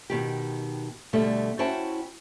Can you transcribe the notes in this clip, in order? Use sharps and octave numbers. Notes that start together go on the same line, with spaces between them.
B2 D#3 G4
B2 D3 G3 A3
C#4 E4 F#4 C5 G5 A5